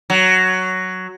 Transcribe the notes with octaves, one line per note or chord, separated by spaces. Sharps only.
F#3